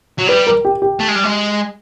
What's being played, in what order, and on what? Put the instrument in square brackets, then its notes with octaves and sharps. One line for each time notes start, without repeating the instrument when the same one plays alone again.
[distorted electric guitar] F#3
[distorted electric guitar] G3 [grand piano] B4
[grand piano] A#4
G4
G4
[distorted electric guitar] A3
G#3
G3
G#3